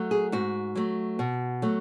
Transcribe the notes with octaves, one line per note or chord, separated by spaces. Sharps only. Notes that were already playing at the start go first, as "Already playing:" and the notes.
Already playing: F#3 A3
G#4
G#2 F#4
F#3 A3
B2
F#3 A3